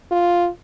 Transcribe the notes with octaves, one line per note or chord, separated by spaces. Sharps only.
F4